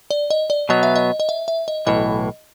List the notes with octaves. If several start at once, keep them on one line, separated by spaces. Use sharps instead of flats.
D5
D#5
D5
B2 F#3 B3 D#5
E5
D#5
D#5
E5
E5
D#5
B1 A2 E3 D#5